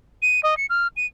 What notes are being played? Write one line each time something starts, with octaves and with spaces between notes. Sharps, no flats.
D#7
D#5
C#7
F6
D#7